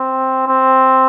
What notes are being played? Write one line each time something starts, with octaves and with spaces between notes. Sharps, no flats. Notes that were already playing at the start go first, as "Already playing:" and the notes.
Already playing: C4
C4